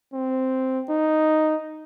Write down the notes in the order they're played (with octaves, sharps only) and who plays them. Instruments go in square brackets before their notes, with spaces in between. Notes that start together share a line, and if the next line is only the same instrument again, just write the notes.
[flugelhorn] C4
D#4